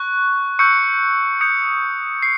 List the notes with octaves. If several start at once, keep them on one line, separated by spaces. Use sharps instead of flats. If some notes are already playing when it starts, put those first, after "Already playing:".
Already playing: C#6 F#6
C#6 E6 G6 C#7
D#6 G6 C#7
C7